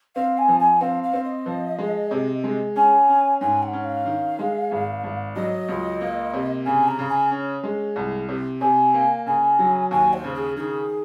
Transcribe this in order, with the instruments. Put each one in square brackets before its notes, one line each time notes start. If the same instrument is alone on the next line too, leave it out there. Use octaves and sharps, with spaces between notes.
[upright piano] C4 [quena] F5
[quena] G#5
[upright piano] F3
[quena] G#5
[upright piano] C4 [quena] F5
[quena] F5
[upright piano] C4
[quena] D#5
[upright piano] F3
G#3
C3
G#3
[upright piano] C#4 [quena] G#5
[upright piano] C#4
[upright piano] G#2 [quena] G#5
[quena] F#5
[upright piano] C#4
[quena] F5
[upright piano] D#3
G#3
G#1
G#1
[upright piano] F#3 [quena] D#5
[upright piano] C#2
A#3
C3
[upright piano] C#3 [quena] G#5
[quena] A#5
[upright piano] C#3
[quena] G#5
[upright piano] C#4
G#3
C2
C3
[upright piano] C3 [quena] G#5
[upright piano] A#3
[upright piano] C#3 [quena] G#5
[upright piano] F#3
[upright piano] D#2 [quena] G#5
[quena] C5
[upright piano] C#3
[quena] G#4
[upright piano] D#3 [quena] G#4